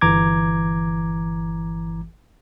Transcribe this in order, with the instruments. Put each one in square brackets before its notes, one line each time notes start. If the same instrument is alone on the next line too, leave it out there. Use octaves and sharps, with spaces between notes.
[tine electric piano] G1 E3 A#5 D6 G#6